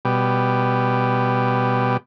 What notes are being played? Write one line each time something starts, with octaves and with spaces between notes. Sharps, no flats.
B2 G3